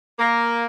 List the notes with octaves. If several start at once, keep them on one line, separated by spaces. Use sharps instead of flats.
A#3